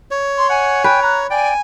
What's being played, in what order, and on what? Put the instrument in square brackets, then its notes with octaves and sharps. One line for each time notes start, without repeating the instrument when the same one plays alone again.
[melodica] C#5
[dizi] C6
[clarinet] F#5 [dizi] G#5
[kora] B4 [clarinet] G5
[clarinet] A#5 [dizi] F#6
[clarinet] D5 [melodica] G5 [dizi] G#5